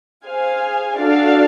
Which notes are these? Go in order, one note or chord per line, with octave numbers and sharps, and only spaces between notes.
G#4 C5 F5 G#5
D4 F#4 A4 D5 F5